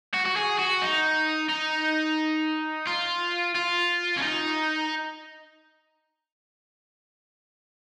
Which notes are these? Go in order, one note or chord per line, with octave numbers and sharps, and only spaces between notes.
F#4
F#4
G#4
F#4
D#4
D#4
F4
F4
C#4
D#4